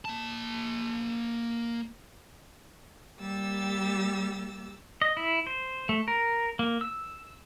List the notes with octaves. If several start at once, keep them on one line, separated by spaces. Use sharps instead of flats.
A#3 A5
G3 A#3 G4 E6 A6
D#5
E4
C5
A3
A#4
A#3
E6